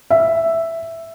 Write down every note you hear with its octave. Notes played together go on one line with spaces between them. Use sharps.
E5